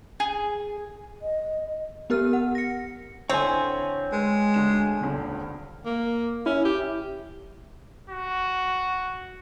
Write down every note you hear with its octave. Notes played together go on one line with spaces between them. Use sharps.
G#4
D#5
B3 G4 A#4 F6
F#5
A#6 C#7
D3 C4 E4 A4 C#5 G#5
G#3 B4
D2 D4 E7
D#1 C#2 D3
A#3
C#4 E4
G4
F#4